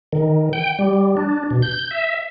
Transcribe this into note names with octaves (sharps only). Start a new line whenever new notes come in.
D#3
G5
G3
D4
B2
G6
E5